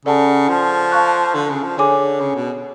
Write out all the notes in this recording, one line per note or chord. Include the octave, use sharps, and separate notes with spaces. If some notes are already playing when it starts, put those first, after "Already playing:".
C#3 A4 D5 F#5 A5
F3
F5 A5 C#6 F#6
D3
C#3
F3
D3 G#4 C#5 G#5 D6
C#3
B2